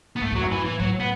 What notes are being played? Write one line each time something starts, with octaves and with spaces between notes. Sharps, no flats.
B3
G#2 A3
E2 F#3
F#2
A2 E3
E3
A2 F#3
B3